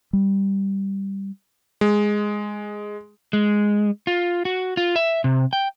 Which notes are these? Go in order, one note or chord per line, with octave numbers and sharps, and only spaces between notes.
G3
G#3
G#3
F4
F#4
F4
E5
C3
G5